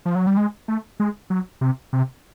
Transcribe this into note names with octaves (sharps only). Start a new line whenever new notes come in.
F3
F#3
G3
G#3
A3
G#3
F#3
C3
C3